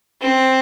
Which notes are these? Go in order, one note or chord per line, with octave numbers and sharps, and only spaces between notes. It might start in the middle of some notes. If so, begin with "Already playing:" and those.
C4